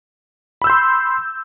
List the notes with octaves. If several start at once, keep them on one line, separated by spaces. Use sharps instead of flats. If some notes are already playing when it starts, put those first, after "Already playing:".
B5 C6 E6 G6